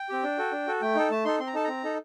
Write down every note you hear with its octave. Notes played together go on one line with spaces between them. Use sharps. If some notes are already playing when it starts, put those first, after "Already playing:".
Already playing: G5
C4 G4
D4
F#4 A4
D4
F#4 A4
A3 G5
D#4 A4
A3 A5
D#4 A4 C6
C4 C6
A#5
D#4 A4 A5
C4 A#5
D#4 A4